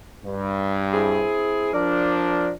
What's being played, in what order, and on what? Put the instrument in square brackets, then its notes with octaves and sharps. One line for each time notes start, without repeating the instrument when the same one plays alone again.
[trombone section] G2
[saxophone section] C4 E4 G#4
[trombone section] F3 D4 [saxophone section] A#4 D5